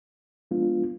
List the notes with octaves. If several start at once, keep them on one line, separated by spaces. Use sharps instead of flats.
F3 G#3 B3 D4 F4